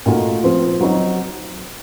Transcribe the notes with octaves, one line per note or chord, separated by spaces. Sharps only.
A#2 A3 D#4 F#4
F3 C4 F4
F#3 C4 D#4 F#4